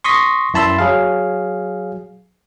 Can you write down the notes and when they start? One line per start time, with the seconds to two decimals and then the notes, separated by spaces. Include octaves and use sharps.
0.04 C6 C#6 D#6 A#6 B6
0.54 F#2 E4 A5 B5 C6 E6
0.79 F#3 G#4 F5